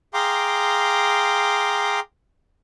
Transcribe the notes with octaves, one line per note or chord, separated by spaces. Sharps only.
G#4 F5 G5 A#5 C6 D6